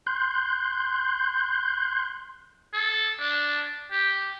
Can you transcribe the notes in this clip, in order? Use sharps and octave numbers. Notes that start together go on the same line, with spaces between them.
C6 F#6 G6
A4
D4
G4